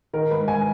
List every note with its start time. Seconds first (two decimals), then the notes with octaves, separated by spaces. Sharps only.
0.13 D#3 A#4
0.30 G#2 B4
0.47 G#2 G#5